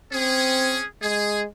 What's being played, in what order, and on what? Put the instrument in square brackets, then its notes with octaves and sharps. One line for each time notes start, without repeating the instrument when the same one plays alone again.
[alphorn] C4 [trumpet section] C#4 G#4
[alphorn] G#3 [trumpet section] G#4